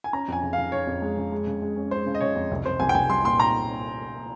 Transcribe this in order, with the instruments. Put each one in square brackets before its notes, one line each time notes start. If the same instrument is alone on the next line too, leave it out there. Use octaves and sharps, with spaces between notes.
[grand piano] G#5
[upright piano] C#4 [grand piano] A#5
[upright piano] F2 [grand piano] G#5
[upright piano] C#3
[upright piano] C#3 [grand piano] F5
[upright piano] C#3 [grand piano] C#5
[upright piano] F2
G#3
C#3
G#3
C#3
G#3
C#4
[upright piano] G#3 [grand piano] C5
[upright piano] C#3
[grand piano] D#5
[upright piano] C#3 [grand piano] C#5
[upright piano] F2
C2
[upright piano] C2 [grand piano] C5
[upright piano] C2 [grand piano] G#5
[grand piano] G5
[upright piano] C2 [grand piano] G#5
[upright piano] G3 [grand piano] C6
[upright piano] A#2 [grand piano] C6
[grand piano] A#5